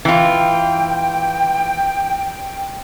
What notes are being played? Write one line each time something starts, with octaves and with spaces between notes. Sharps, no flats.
E3 F4 G5